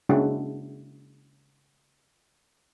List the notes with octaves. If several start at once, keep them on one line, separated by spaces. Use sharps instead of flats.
C#3 G#3 A#3 D4 E4 F#4